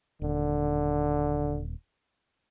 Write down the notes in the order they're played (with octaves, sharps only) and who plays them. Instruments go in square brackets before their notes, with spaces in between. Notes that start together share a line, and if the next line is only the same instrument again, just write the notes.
[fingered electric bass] D#1 [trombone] D3